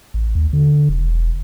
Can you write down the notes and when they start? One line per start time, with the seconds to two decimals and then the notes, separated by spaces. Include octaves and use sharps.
0.14 A1
0.35 D#2
0.53 D3
0.89 E1